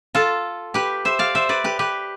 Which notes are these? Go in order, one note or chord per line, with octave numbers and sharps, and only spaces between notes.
F4 A4
G4 B4
C5 E5
D5 F5
C5 E5
B4 D5
G4 B4
G4 B4